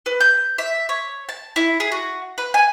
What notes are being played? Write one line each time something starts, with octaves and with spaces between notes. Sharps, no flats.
B4
G6
E5
C#5
A5
E4
G#4
F#4
B4
G#5